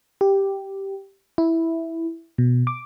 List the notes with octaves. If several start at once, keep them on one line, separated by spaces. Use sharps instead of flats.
G4
E4
B2
D6